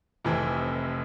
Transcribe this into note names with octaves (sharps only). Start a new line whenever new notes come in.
F1 F2 C3 E3